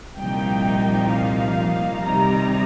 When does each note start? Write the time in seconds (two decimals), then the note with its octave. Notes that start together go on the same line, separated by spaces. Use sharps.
0.18 C2 A#2 F3 A#3 D#4 G5
1.11 F5
2.03 C3 D#3 G3 D#4 A#5